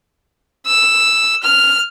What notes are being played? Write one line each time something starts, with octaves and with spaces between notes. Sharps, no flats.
E6
F6